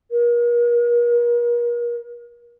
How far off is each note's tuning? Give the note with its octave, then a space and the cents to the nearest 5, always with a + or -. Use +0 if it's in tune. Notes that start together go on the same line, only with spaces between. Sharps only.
A#4 +40